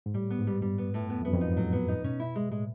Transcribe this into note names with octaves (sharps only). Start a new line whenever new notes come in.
G#2
A2 G3
B3
G#2
G3
G2 G3
B3
A2
F#2 B3
F2
F#2 B3
F2
G#2 D#4
A2 F#3
B3
D#4
B2 C#4
E4
G#3
A2 G#3